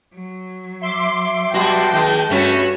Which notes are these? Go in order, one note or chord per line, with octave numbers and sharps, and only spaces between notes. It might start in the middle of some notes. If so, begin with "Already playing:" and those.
F#3
E5 C6 D6
B2 G3 F#4 G5 A5
D#2 G#3
G2 A3 C#4 F#4 C#5 B5 E7